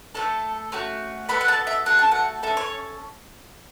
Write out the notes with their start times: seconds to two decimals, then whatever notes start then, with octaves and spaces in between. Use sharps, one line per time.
0.15 A3 C#4 A4 A5
0.72 A3 C#4 F#4
1.29 B3 F#4 A4 B5
1.41 F#5
1.48 A5
1.67 E5
1.86 A3 F#4 A4 F#5
1.99 A5
2.11 F#5
2.43 C#4 A4 E5
2.57 C#5